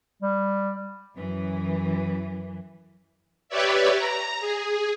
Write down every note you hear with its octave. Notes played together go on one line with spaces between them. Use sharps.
G3
F#2 E3
G4 B4 C#5 D5 E5
A#5
G#4